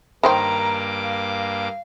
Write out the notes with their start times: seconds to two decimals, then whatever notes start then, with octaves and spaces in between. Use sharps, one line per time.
0.23 G2 D#3 A#3 C5 G5 A#5 D6
1.04 F5